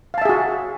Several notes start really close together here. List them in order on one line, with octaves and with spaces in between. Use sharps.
F5 A5 E5 G#4 F#4